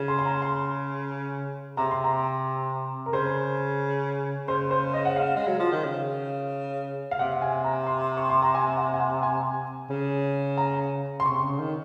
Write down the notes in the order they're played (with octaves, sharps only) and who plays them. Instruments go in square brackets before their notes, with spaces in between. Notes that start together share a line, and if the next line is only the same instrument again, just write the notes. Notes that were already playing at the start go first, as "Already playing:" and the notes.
Already playing: [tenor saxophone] C#3
[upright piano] C6
C6
A#5
C6
[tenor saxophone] C3 [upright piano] A#5
[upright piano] C6
A#5
A#4
[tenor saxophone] C#3 [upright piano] C5
[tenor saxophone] C#3 [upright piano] C5
[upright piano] C5
D#5
F#5
F5
[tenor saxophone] G#3
F#3
F3
D#3
C#3
[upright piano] F5
[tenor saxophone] C3 [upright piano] F#5
[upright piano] G#5
A#5
C6
C#6
C6
A#5
G#5
F#5
G#5
F#5
G#5
[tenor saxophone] C#3
[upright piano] A#5
C6
[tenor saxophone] C3 [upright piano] C#6
[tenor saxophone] C#3
D#3